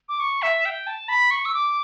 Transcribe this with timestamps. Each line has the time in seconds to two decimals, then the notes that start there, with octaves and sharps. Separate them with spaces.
0.09 D6
0.20 C#6
0.42 E5
0.65 G5
0.87 A5
1.09 B5
1.31 C#6
1.45 E6
1.54 D6